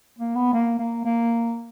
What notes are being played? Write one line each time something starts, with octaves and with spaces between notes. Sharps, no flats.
A#3
B3
A#3
A#3
A#3